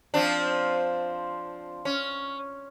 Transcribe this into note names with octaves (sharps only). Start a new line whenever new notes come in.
F3 C4 D4
C#4